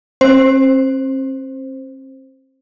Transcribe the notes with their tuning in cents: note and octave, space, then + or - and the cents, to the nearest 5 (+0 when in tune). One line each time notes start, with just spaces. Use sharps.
C4 +40 C5 +0